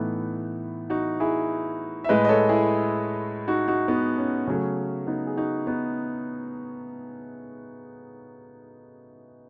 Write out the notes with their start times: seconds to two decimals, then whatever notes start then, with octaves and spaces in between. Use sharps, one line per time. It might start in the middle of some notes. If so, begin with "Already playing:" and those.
Already playing: A2 E3 A3 B3 D#4
0.90 D#4 F#4
1.20 E4 G#4
2.04 E5
2.09 A2 G#3 B4 D#5
2.24 D#5
2.29 A4 C#5
2.49 E4 G#4
3.48 D#4 F#4
3.68 D#4 F#4
3.88 B3 D#4
4.18 C#4
4.47 C#3 F#3 A3 C#4
5.07 B3 D#4
5.27 G#4
5.37 D#4 F#4
5.67 B3 D#4